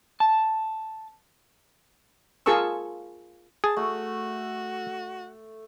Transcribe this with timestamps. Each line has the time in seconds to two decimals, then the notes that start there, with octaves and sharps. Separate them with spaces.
0.20 A5
2.46 F4 G#4 A#4 A5 C#6 E6
3.64 G#4 A5
3.76 A3 F#4